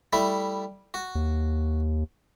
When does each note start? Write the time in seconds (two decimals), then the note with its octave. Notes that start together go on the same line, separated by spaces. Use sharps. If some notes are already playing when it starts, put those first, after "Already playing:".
0.13 G3 A3 E4
0.94 F#4
1.15 D#2